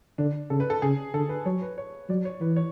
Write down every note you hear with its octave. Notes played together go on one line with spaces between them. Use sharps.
D3 D4
C#3 A4
B4
A4
C#3 G#4
D3 A4
B4
F#3 C#5
B4
C#5
F#3 D5
C#5
E3 B4
C#5